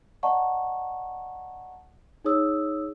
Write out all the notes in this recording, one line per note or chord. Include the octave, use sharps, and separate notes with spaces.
D5 D#5 F#5 A5 A#5 C#6
D#4 G#4 C#5 D#6 E6